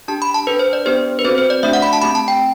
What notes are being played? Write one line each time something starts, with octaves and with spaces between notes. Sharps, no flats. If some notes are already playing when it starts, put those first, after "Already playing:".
D4 G4 A5
B5
A5
D4 A4 B4
C5
D5
B3 D4 G4 C5
B4
C4 F#4 A4 C5
C5
D5
A3 D4 F#4 E5
F#5
B5
A5
A3 C4 G4 B5
A5
G5